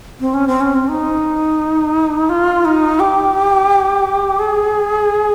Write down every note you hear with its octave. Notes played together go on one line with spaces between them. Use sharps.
C4
C#4
C4
C#4
C4
D#4
F4
D#4
G4
G#4